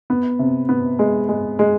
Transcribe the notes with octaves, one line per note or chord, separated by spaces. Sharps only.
B3
C3
B3
G#3
G#3
G#3